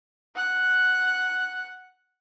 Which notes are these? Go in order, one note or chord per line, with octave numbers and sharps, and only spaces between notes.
F#5 F#6